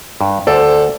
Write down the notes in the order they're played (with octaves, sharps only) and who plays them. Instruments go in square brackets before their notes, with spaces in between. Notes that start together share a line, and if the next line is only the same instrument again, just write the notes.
[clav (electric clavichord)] G2
[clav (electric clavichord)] D2 [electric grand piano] A4 C5 D5